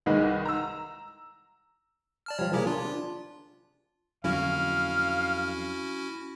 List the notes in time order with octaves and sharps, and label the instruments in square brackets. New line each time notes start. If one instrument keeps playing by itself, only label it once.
[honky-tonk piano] C2 D#3 G#3 B4 D#5
A#5 E6
[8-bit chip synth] D5 A5 F6
[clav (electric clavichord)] F3 G3 [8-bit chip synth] C#5
[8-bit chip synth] C3 E4 G4 [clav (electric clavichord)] A#3 G#4
[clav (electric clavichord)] D4 [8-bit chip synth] F4
[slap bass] F2 D3 F#3 [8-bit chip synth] C#4 E4 F#4 [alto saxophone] F5